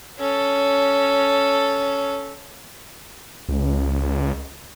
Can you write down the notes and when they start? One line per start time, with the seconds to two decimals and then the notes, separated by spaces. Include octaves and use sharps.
0.19 C#4 A4
3.49 C#2